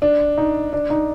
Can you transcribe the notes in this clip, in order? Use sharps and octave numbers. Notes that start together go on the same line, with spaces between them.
D4
D#4
D4
D#4